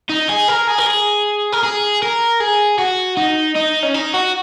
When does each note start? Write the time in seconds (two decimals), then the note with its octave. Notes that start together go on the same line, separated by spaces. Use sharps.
0.09 D#4
0.29 G#4
0.49 A#4
0.68 G#4
0.79 A#4
0.87 G#4
1.53 A#4
1.64 G#4
2.03 A#4
2.40 G#4
2.79 F#4
3.17 D#4
3.55 D#4
3.83 C#4
3.94 D#4
4.14 F#4